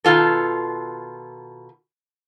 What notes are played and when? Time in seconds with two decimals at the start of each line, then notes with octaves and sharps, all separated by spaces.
0.04 B2 D#3 F4 A4